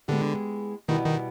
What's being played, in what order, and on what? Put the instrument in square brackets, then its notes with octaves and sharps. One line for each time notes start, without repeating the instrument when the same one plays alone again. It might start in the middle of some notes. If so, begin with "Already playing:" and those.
[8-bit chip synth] D3 [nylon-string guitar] G#3 B3 E4 G4
[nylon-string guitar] B2 G3 B3 E4 [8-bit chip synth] D#3
[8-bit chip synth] D#3